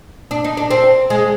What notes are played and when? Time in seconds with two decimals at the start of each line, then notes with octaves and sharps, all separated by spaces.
0.31 D4
0.44 D#4
0.57 D4
0.70 C4
1.10 G#3